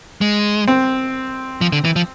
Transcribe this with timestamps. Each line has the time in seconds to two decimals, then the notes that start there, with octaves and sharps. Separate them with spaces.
0.21 G#3
0.68 C4
1.61 F3
1.72 D3
1.85 E3
1.96 F3